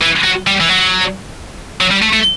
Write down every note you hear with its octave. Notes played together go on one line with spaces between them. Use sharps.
E3
F#3
G3
E3
F#3
F#3
G3
A3
A3